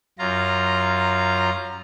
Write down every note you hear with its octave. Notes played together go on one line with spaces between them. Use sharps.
F#2 F4 A#5